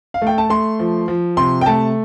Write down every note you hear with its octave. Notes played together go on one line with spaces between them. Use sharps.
F5
A3
G5
A5
A3 C6
F3
F3
C3 C6
G5
A3 A5